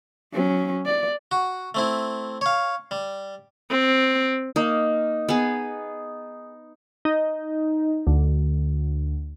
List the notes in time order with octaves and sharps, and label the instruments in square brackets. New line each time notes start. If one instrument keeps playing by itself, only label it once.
[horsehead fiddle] F#3 C#4
D5
[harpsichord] F#4
A3 C4 E4
C#5 F5
G3
[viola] C4
[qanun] A#3 [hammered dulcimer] D#4
[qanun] B3 G#4
[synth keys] D#4
D2